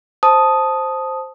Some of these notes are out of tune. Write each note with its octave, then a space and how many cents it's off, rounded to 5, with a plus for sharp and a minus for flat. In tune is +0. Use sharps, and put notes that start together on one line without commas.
C5 +0 A5 -5 D#6 +0